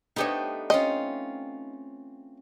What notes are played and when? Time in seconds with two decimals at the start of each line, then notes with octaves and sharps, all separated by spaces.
0.16 A3 B3 D4 D#4 G4 C#5
0.70 C4 C#4 F4 D#5